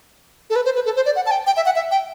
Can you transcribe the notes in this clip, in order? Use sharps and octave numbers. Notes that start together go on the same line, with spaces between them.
A4
B4
C5
B4
A4
C5
D5
F#5
A5
G5
G5
E5
F#5
E5
G5